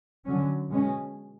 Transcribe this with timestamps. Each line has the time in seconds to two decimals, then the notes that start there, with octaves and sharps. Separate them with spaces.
0.25 D3 F#3 C#4
0.70 B2 G#3 C#4